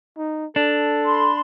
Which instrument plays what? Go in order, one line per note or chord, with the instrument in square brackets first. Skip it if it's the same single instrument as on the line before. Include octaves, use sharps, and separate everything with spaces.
[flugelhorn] D#4
[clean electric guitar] D4 [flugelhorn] A4
[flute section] B5 C6